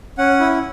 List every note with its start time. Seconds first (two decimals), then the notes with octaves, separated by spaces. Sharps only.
0.18 C#4 F#5
0.40 E4